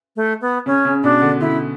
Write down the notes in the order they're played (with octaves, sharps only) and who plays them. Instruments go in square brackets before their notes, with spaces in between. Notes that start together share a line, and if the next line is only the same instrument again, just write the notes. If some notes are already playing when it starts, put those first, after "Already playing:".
[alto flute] A3
B3
[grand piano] C#3 [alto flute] C#4
[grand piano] C#3
[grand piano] B2 [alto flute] D4
[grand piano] D3
[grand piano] D3 [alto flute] E4